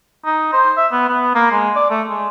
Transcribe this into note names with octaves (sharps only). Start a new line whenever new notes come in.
D#4
C5
E5
B3
B3
A#3
G#3
D5
A3
G#3